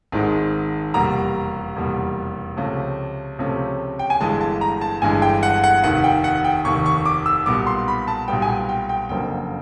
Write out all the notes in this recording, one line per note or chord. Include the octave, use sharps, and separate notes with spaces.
G#1 G#2 D#3 G#3
F1 E2 B2 G3 A#3 A#5
F1 E2 B2 G3 A#3
C#2 C3 F3 A3 C#4
C#2 C3 F3 A3 C#4
G5
G#5
G1 G2 E3 G#3 A5
A5
A#5
A5
G1 G2 E3 G#3 G#5
G5
F#5
F#5
F1 D#2 D#3 F#5
G5
F#5
G5
F1 D#2 D#3 C#6
C#6
D6
E6
B1 A#2 G3 B3 D6
C6
B5
A5
B1 A#2 G3 B3 G5
G#5
G5
G5
G5
F#1 F2 D3 F#3 A#3 G5